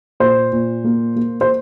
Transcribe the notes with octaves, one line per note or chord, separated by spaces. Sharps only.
A#2 C5
A#2
A#3
A#3
C5